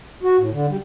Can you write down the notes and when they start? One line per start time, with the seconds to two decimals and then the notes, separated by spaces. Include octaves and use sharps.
0.23 F#4
0.38 A2
0.52 D3
0.68 G3